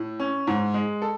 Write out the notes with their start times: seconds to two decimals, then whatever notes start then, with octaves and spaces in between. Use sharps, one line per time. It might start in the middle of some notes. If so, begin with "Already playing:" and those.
Already playing: A2
0.20 C#4
0.47 G#2
0.74 G#3
1.02 A4